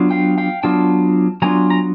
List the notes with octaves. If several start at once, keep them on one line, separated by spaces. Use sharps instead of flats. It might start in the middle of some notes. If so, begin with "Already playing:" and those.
Already playing: F#3 B3 D4 F4
F5 G5
F5 G5
F#3 B3 D4 F4 G5 A5
F#3 B3 D4 F4 G#5 A#5
A#5